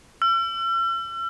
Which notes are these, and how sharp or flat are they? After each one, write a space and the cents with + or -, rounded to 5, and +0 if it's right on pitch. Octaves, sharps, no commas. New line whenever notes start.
E6 +45